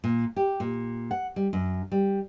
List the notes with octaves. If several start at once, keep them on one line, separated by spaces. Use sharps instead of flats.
A#2
G4
A#2
F#5
G3
F#2
G3